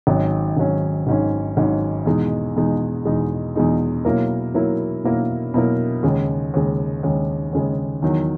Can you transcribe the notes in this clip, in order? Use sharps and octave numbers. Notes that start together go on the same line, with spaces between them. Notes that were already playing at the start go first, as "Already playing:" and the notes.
G#1 G#2 F#3 C#4
G#1 G#2 F#3 C#4
G#1 G#2 F#3 C#4
G#1 G#2 F#3 C#4
E2 B2 G#3 D#4
E2 B2 G#3 D#4
E2 B2 G#3 D#4
E2 B2 G#3 D#4
B2 F#3 A#3 E4 A#4
B2 F#3 A#3 E4 A#4
B2 F#3 A#3 E4 A#4
B2 F#3 A#3 E4 A#4
D#2 C#3 G#3
D#2 C#3 G#3
D#2 C#3 G#3
D#2 C#3 G#3
E2 D#3 F#3